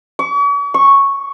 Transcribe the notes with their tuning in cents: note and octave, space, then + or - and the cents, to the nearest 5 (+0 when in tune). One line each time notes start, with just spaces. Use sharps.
C#6 +45
C#6 -5